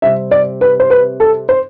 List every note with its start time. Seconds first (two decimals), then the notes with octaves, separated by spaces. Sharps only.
0.02 C3 G3 C4 E5
0.31 D5
0.61 B4
0.80 C5
0.90 B4
1.20 A4
1.49 C5